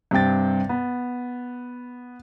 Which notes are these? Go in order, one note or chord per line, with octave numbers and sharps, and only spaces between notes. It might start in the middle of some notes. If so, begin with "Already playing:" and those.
G2 C3 C4 G5 A6
B3